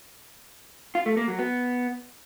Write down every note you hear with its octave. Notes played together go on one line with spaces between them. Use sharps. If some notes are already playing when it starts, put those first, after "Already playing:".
F4
A3
A#3
F#3
B3